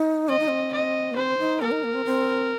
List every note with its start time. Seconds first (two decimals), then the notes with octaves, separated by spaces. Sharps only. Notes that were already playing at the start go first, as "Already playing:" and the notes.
Already playing: D#4
0.29 C4 D#5
0.39 D#4
0.49 C4
0.73 D#5
1.11 A#3
1.16 C4 C5
1.38 D#4
1.61 A#3 A#4
1.71 D#4
1.84 A#3
1.94 C4
2.05 C4